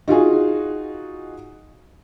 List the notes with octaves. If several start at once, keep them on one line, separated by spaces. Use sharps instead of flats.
D#4 F4 F#4 G#4